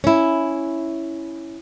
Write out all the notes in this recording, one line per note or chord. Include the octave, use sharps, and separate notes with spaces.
C#4 E4